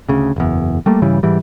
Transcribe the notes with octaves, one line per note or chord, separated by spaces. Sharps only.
D2 C#3
F#1 E2
G3 A3 A#3
G2 C#3 E3 G3
G#2 E3 G3